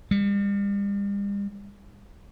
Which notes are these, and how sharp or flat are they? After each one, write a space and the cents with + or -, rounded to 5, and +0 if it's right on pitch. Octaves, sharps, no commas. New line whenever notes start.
G3 +40